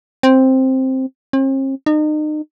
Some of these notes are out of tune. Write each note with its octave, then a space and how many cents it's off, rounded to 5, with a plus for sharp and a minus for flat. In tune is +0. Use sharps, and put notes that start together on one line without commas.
C4 +5
C4 +45
D#4 -35